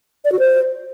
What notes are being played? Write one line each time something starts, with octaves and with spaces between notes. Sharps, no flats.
D5
F#4
C5